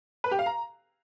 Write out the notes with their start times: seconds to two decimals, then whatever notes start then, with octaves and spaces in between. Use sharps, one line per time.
0.24 B4
0.31 G4
0.39 F5
0.46 A#5